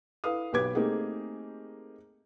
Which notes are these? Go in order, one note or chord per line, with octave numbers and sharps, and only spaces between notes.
E4 A4 B4 F5 D#6
B1 G4 B4 D6 G#6
A3 A#3 C4 D#4 G4 G#4